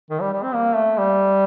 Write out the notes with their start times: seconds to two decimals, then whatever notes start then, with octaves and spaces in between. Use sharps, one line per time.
0.10 D#3
0.21 G3
0.33 G3
0.43 C4
0.54 A#3
0.75 A3
0.98 G3